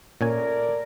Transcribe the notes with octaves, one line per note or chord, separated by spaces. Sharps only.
A#2 A3 C#4 A#4 D5 G#5